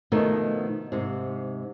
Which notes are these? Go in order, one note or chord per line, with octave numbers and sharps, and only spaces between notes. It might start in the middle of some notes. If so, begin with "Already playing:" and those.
B2 D#3 F3 A3 B3 D#4
G#2 C3